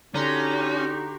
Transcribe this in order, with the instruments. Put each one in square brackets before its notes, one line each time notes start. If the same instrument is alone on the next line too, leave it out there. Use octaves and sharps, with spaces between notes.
[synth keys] D3 A#5 C6 [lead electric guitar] C#4 [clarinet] D#4 [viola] F#4 G4